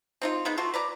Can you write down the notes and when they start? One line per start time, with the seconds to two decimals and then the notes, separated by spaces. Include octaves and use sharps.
0.22 C4 D#4 F4
0.45 G#3 B3 D#4
0.57 A3 F4 F#4
0.74 B4 D5 A#5